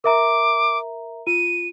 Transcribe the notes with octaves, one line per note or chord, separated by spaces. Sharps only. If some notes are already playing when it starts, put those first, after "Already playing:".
A#4 E5 A#5 D6
F4 D#7